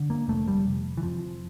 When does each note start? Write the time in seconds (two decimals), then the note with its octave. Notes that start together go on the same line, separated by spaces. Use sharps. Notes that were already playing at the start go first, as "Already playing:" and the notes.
Already playing: D3
0.10 A#3
0.28 F1 A3
0.48 G3
0.66 F1
0.97 E3
1.02 F2 F3